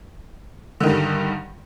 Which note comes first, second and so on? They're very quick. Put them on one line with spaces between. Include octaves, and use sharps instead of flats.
D3 D#3 G2 G3